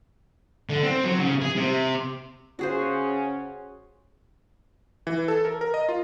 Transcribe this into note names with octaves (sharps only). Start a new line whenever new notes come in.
D3
C4
F#3
C#3
G#4
C3
C#3 C#4 F#4 G#4 C5
E3
A4
A#4
A#4
D#5
F4